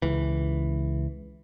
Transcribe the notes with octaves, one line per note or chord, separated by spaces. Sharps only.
C#2 E3